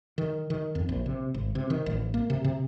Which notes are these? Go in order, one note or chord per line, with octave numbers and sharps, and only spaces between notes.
D#3
D#3
F2
A#1
C3
G#1
C3
D#3
A1
A#3
C3
C3